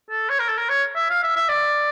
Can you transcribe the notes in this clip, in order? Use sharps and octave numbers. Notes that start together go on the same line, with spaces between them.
A4
C#5
A#4
A4
A#4
C#5
E5
F5
E5
E5
D5